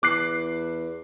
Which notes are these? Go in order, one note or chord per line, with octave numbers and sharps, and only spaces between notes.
E2 D6 F#6 C7